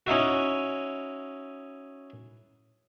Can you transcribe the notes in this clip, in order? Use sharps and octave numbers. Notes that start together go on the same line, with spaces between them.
C#4 D#4 E4 F#4